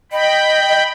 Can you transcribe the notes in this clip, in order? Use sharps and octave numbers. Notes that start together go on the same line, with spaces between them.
D#5 G5 B5